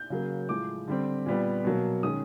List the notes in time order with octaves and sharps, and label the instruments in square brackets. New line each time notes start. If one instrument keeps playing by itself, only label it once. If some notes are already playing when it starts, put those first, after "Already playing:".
Already playing: [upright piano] G6
C#3 F#3 A#3
A2 F3 G#3 D6
D3 G3 C4
A#2 G3 B3
B2 F#3 A#3
D#3 G#3 C#4 D#6